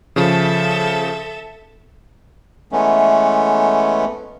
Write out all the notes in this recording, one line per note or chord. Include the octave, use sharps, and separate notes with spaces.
C#3 F3 A4 E5
E3 G#3 A3 B3 C#4